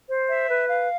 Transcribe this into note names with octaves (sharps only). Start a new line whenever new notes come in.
C5
E5
B4
F5